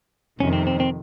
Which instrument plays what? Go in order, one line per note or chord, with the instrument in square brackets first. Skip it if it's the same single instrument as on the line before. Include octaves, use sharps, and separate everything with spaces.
[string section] F2 C3 D#3 [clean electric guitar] C#4
[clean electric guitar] C4
C4
C4